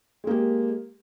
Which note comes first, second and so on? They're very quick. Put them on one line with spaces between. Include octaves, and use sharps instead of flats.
G#3 A#3 G4